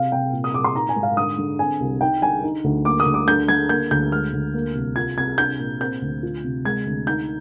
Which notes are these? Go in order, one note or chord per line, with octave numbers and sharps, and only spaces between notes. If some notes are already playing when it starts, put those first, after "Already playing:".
Already playing: C3 F5
C3 G5
A#2
D#6
A#2 D6
C6
D#4 A#5
G#5
G#2
F5
D3 D#6
D3
C4 G#5
C2
D#4 G5
D3 G#5
D#4
D2
A#3 D6
D#6
D2
D6
D3 G6
D3 G#6
A#3 G6
D2 G6
G#3 F6
D2
A#3
C2
F4 G#6
C3 G#6
D4 G6
A#2
C4 G6
D2
F4
C3
G#3 G#6
D2
D#4 G6